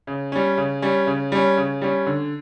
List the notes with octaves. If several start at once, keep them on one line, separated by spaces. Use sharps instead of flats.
C#3
G3 C#4
C#3
G3 C#4
C#3
G3 C#4
C#3
G3 C#4
D3